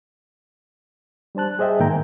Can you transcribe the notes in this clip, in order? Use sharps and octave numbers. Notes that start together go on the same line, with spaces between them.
G3 D4 C5 A5 F#6
G#4 C5 D#5 E5 G5
G#2 D#3 A#3 G5 G#5 A#5